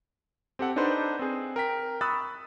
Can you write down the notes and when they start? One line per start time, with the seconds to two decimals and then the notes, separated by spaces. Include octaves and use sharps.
0.59 C4 G4 A4 F#5
0.76 D4 D#4 A4 B4 C5 D5
1.19 C4 G#4
1.56 A#4 G5 B6
2.01 B5 C#6 D#6 E6 F#6 A6